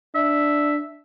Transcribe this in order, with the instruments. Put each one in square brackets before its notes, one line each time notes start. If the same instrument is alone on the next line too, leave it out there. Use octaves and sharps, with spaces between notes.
[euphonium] D4 [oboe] E5